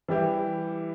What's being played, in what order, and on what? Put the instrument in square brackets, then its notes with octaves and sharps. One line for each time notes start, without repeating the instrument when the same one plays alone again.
[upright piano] E3 G3 E4 G4